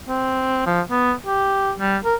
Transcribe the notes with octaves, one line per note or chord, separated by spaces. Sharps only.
C4
F3
B3
G4
G3
A#4